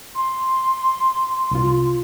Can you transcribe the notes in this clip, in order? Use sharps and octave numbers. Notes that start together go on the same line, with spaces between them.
C6
C2 F4